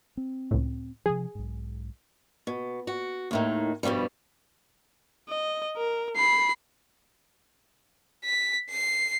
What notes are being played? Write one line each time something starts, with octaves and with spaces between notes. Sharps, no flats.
C4
C#2 A2
C3 D#3 F3 G#4
B1 G#2
B2
F#4
D#2 A2 D#3
G2 B2 D3 F3 G3
D#5
A#4
B5 C7
B6
C7